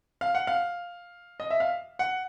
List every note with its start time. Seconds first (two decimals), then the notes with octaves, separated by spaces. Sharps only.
0.21 F5
0.35 F#5
0.47 F5
1.40 D#5
1.51 E5
1.60 F5
1.99 F#5